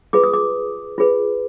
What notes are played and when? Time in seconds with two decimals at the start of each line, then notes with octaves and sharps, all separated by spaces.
0.13 F4 G#4 B4 D6
0.24 D#6
0.34 D6
0.98 F4 G#4 B4